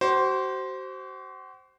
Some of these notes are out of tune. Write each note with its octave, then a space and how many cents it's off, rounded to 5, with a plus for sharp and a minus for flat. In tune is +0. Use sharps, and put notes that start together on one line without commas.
F#4 +40 C5 +0